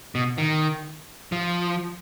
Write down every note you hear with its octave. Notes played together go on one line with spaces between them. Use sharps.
B2
D#3
F3